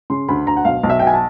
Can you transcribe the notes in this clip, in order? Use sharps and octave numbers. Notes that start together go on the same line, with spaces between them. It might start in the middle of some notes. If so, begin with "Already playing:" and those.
C#3 C6
D2 B5
D2 A#5
F#5
B1 F5
B1
E5
B2 G5
G#5
A5